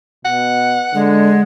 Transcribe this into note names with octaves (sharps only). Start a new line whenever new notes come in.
B2 F#5
D3 G#3